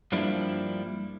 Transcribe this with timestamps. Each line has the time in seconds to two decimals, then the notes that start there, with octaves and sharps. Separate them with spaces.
0.12 G2 F3 G3 A#3 D4 E4